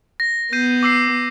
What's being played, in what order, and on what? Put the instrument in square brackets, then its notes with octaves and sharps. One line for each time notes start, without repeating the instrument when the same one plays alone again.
[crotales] A#6
[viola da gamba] B3 [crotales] G6 C7 D#7
[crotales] D6 E6 C7